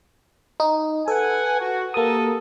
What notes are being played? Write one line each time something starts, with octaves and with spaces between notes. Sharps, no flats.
D#4
A4 B4 F#5 G#5
F#4
A#3 G4 A4 A#4 D#6